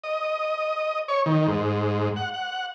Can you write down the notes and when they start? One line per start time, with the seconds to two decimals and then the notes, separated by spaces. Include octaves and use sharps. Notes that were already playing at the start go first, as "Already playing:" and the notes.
0.04 D#5
1.08 C#5
1.26 D#3
1.47 G#2
2.16 F#5
2.34 F#5